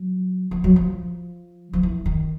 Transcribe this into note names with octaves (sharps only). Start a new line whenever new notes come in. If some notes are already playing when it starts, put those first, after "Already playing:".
Already playing: F#3
F3
F#3
F3
F3
E3
D#3